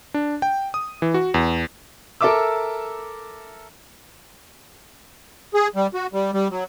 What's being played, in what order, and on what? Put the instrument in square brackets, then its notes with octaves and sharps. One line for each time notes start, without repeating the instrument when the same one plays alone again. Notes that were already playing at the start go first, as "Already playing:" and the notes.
[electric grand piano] D4
G5
D#6
E3
F#4
E2
[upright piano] A4 A#4 E5 D6 E6
[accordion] G#4
G3
F#4
G3
G3
F#3